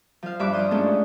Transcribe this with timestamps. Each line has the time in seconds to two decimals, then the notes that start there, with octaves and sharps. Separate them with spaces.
0.23 F3 F5
0.39 G2 E5 B5 D6 F#6
0.53 F4 C6 D#6
0.71 G#2 A3 C#4 D4